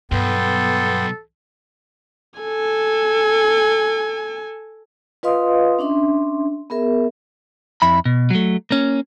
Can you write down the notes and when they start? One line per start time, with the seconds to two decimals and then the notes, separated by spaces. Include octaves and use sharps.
0.12 B1 G2 B3 A4 G5 C6
2.40 A4 G#5
5.23 F4 B4 D#5 F5 C6 D#6
5.79 C#4 D4 E5 C6
6.70 B3 G#4 A#4 E5
7.82 F2 E4 B5
8.06 B2
8.30 F#3 A3
8.71 A#3 C#4